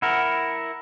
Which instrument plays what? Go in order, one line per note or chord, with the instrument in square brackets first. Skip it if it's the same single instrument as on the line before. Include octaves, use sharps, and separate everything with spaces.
[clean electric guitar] E4 A#4 [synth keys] F#5 C#7